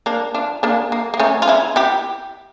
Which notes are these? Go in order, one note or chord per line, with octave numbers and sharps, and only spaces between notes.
A#3 D4
D4 F4
A#3 D4
A#3
A#3
A3 C#4
F4
C#4 E4
E4 G4